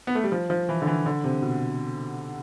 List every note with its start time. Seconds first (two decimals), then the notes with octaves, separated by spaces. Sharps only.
0.07 B3
0.15 A3
0.24 G3
0.32 F3
0.50 F3
0.69 E3
0.82 D3
0.87 E3
1.06 D3
1.24 C3
1.42 B2